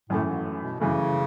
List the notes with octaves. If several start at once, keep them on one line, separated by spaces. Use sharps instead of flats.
F#2 A2 E3 A3
G#2
B2
F#2 C#3 E3 A3